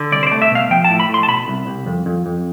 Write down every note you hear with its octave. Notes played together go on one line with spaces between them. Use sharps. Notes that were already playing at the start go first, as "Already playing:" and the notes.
Already playing: D3
C2 D5
C5
A3 D5
E5
B2 F5
F3 G5
A5
A2
B5
A2
C6
A5
B2 B5
C2
C2
F2
F2
F2